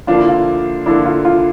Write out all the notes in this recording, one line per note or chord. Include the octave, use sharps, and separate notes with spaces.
D3 F3 A#3 D4 F4
E4
F4
D3 F3 A#3 D4 E4
F4
F4